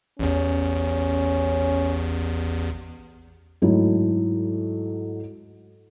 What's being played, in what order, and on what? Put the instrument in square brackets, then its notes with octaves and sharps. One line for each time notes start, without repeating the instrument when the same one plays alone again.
[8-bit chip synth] A1 E2 [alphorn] C#4
[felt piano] G#2 F#3 A3 E4